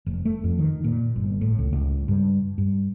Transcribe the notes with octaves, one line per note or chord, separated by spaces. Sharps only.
F1
A3
F2
D#3
A#2
G1
A2
C#2
C#2
G2
G2